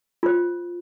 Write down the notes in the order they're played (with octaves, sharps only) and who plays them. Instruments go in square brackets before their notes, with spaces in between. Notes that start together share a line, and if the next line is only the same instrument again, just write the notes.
[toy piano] F4 C5